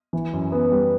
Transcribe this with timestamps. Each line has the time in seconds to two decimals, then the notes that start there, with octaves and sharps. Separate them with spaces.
0.13 E3
0.33 F#2
0.52 B3
0.72 G3